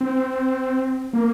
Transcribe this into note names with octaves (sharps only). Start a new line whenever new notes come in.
C4
A#3